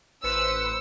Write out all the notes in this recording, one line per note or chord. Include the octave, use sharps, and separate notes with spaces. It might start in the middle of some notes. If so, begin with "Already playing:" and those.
A1 B4 C5 E6 C#7